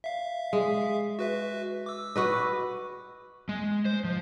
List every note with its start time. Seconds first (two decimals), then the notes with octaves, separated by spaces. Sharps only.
0.04 E5 F5
0.53 G#3
1.19 F#4 B4 E5
1.86 D6 E6
2.16 F#4 B4 D#5
3.49 G#3
3.85 C5
4.04 F3